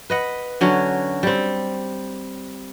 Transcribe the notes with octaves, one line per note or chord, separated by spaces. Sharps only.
B4 D#5 F#5
D3 F#3 C#4
G3 C4